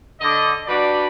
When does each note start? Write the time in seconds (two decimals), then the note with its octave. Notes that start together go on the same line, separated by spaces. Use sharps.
0.21 D3 D#5
0.67 G3 D4 F#4 B4 D5